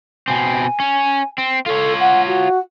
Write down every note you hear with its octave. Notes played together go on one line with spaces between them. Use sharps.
B2 C4 G#5
C#4
C4
F4 A4 C#5
F#5
F#4